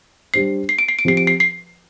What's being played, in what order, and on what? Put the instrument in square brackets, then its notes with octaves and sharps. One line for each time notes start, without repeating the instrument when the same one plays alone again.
[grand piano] G3 D4 G4 C5 [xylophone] C7
[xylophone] C7
D7
C7
D7
[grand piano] F3 C4 G4 [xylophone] C7
[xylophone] D7
C7
C7